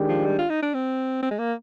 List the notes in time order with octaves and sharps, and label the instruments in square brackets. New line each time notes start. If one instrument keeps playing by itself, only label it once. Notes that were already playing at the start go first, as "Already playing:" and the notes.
Already playing: [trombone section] D#3 G#3 D4 G4
[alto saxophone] F3
G3
F4
D#4
D4
C4
C4
G#3
A#3